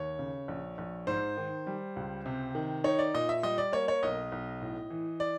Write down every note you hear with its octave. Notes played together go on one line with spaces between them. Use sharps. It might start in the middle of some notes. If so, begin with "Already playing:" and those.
Already playing: D#2 C#5
C#3
A#1
A#1
G#2 C5
D#3
G3
C#2
C3
D#3
D#4 C#5
D5
A#2 D#5
E5
G3 D#5
D5
A#3 C#5
C#5
B1 D#5
B1
A2
E3
D5